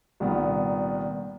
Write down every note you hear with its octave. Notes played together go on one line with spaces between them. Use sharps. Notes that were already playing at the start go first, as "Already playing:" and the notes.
C2 A#2 D#3 B3